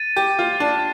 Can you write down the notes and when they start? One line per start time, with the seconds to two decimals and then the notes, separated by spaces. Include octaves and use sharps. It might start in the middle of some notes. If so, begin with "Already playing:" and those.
Already playing: A6 D#7
0.16 G4
0.39 F4
0.60 D4